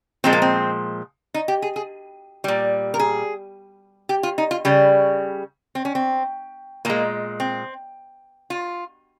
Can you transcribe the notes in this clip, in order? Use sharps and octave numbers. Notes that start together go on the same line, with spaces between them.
A#2 F3 G#3 C4
A#3
C4
D#4
G4
G#4
G#4
A#2 G3
A#4
G#4
G4
F4
D#4
F4
C#3 G3
C4
C#4
C4
A#2 G#3 A#3
C4
F4